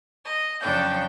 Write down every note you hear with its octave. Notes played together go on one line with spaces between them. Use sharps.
D#5
F2 C#3 F#3 D4 G5 G6